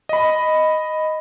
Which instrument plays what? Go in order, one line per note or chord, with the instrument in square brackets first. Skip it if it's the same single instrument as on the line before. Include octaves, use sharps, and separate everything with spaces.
[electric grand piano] D#5 B5